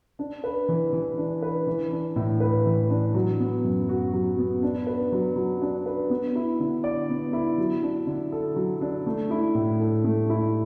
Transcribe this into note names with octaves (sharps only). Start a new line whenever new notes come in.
D4
B4
E3
E3
D4
B4
E3
D4
A2
B4
E3
D4
F#3
B3
F#2
F#4
F#3
B3
D4
B4
F#3
F#3
D4
B4
B3
E4
D3
D5
B3
E4
F#3
D4
D3
A4
F#3
D4
A3
E4
A2
A4
A3
E4